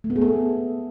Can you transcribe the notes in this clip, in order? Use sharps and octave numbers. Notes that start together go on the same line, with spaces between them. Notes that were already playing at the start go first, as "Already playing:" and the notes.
A3
B3
G#4
A4